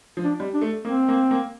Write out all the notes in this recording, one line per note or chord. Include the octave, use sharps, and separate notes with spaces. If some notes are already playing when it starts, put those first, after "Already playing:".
F3
D4
G3
D4
A3
A#3 C4
A#3
A#3